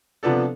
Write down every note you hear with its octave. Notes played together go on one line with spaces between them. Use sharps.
C3 F3 B3 D4 A4